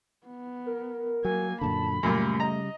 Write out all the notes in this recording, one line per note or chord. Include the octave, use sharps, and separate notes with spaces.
B3
A#4
F#3 A#3 G#5
F#2 A#2 D3 A5 B5
F#2 A#2 C#3 G3 A3
D#5 A#5